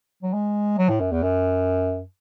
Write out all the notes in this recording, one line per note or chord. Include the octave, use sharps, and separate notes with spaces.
F#3
G#3
F#3
A2
F#2
E2
F#2